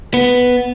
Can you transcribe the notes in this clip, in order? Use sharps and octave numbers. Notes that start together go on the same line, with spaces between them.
B3